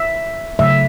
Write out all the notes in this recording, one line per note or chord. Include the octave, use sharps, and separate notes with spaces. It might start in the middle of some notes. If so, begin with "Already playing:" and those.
Already playing: E5
C#3 F#3 A3 E5